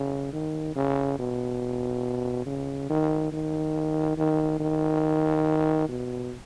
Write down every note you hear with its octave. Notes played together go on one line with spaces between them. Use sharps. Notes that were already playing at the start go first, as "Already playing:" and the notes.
Already playing: C#3
D#3
C#3
B2
C#3
D#3
D#3
D#3
D#3
B2